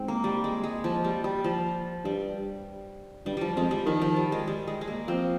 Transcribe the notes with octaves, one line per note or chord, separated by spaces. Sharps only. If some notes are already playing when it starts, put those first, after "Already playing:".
Already playing: G#2 C4
A#3
G3
G#3
G#3
F3
G3
G3
F3
G2 G3
G2 G3
F3 G3
F2 G#3
G3
D#3 F3
F3
G3
G#3
G3
G#3
G#3
A#3
F3 C4